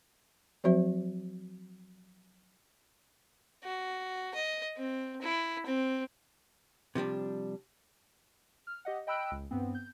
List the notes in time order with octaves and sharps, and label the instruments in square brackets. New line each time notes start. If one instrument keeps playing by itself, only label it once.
[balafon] F3 F#3 C4 F#4 C5 E5
[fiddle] F#4
D#5
C4
E4
C4
[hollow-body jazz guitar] C3 F3 G3 D4
[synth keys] F6
G4 D#5 F#5
D#5 G5 B5 E6 F#6 D7
C#2
G2 B3 C4
G6